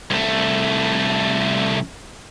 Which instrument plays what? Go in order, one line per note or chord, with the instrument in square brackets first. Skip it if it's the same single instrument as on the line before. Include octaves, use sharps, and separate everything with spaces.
[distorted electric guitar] C2 A3